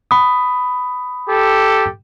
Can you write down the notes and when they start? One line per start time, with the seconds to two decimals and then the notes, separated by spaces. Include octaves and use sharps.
0.11 B5 D#6
1.29 G4 A4